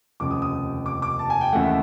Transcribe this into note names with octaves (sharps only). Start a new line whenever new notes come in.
F1 D#2 C#3 F3 D6
D#6
D#6
D6
D6
A5
G#5
G5
D#2 C#3 E3 A3 F#5
E5